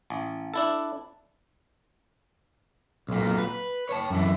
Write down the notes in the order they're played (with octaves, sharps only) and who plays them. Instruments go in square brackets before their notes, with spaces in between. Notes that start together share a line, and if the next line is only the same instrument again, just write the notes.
[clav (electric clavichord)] A1
D4 E4 A4
[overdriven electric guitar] B1 A#2
B4
C#5 A5
F#2 E3